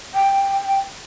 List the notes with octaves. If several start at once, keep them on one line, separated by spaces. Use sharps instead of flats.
G5